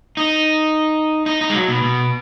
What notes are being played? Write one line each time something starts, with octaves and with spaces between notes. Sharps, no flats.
D#4
D#4
D#4
G#3
F#3
B2
B2